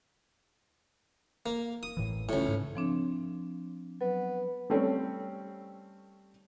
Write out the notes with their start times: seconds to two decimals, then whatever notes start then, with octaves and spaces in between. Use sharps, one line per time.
1.46 A#3
1.83 D#6
1.97 A1 A2 E3
2.29 C#2 A2 A3
2.46 G#2 C#4
2.75 F3 C4 D4
4.01 F#3 B3
4.70 G3 A3 C4 C#4